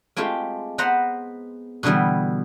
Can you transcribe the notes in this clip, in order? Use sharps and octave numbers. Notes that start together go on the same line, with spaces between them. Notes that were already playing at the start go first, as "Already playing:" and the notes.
G#3 A3 C4 F4 G4
B3 B4 C5 F#5 A#5 C6
B2 D3 E3 G3 B3